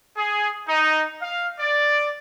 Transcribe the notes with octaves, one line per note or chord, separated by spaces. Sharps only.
G#4
D#4
F5
D5